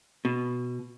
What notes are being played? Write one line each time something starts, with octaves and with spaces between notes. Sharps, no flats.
B2